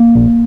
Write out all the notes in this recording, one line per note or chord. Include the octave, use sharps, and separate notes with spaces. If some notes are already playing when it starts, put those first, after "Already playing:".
Already playing: A#3
A#1